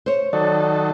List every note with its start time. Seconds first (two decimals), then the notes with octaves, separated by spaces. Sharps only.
0.06 C5 C#5
0.33 D#3 F#3 A4 D5